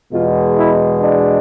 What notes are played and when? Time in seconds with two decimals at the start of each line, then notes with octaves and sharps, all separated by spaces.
0.11 E2 B2 G#3 F4
0.57 E4
1.01 D4